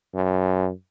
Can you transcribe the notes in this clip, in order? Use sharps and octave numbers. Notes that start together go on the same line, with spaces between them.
F#2